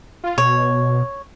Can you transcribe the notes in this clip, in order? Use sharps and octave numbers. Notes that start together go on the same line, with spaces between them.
F4
B2 C#5